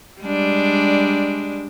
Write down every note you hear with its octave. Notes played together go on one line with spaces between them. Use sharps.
G3 G#3 D4